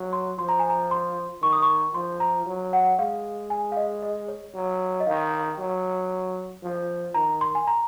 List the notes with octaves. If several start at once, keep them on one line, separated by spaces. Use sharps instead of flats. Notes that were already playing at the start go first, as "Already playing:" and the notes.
Already playing: F#3
C6
F3 C6
A#5
G#5
A#5
C6
D#3 C#6
D#6
C#6
F3 C6
A#5
F#3
F#5
G#3 F5
G#5
F5
D#5
D#5
C#5
F#3
D#5
D#3 F5
F#3
F3
D#3 A#5
C6
G#5
A#5